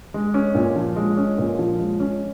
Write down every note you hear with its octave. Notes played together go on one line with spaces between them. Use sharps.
G#3
C#4
A#2
F3
G#3
C#4
A#2
F3
G#3
C#4